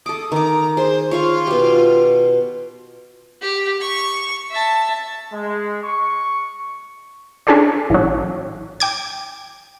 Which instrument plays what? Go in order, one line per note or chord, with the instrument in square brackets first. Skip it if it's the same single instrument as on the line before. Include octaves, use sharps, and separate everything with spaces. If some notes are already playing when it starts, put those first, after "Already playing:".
[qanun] A4 D6 [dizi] D#6
[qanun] D#3 D6 [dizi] A#5
[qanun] G#4 [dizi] C5
[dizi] F4 [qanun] C#5 F5 C#6
[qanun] B2 G4
[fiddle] G4
C#6
E5 A5
[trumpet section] G#3
C#6
[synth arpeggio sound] C#4 D4 G#4 A4 C5 D5
A1 F#3
G5 D6 G#6